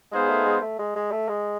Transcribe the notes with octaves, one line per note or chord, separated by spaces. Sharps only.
G#3 B3 D#4 G#4 C5 F5
A3
G#3
A3
G#3
G#3
A3
G#3